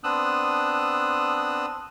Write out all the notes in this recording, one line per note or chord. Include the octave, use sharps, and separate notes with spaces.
B3 C4 D4 D#6 E6 F#6